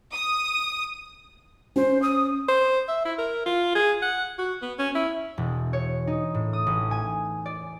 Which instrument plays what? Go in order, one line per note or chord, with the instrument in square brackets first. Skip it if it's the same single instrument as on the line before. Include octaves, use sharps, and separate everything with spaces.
[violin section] D#6
[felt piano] C#4 [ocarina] C5
[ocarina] D#6
[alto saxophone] C5
E5
E4
A#4
F4
G#4
F#5
F#4
B3
C#4
E4
[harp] E1
C#5
D#4
A2
D#6
A1
G#5
D5